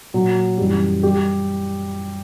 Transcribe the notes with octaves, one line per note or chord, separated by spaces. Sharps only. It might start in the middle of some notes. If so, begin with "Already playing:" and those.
A#2 F#3 F#4
F#2 E3 G3 G4
G3 G4